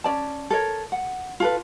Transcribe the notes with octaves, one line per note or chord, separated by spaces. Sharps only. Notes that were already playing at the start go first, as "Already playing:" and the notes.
C#4 D5 A5
A4 A#4 C#5
F#5
F4 A4 B4